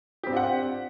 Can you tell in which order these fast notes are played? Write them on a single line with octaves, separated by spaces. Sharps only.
G4 C4 D4 F4 F#5